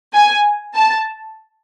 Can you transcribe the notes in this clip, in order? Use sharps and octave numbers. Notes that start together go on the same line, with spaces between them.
G#5
A5